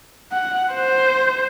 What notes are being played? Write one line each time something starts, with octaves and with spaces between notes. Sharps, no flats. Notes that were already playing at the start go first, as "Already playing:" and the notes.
F#5
C5